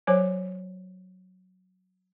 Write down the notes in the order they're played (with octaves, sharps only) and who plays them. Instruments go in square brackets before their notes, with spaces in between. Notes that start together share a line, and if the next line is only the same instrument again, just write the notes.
[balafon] F#3 C5 C#5 G#5